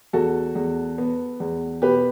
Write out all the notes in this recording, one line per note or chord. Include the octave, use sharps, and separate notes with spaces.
E2 F#4 A4
E2
B3
E2
B2 G4 B4